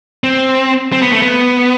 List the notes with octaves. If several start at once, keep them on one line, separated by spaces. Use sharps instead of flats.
C4
C4
B3
A3
B3